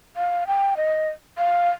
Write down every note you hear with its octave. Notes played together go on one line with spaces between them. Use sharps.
F5
G5
D#5
F5